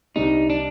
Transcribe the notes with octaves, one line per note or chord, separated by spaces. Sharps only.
C2 C3 G3 D4 D#4
D4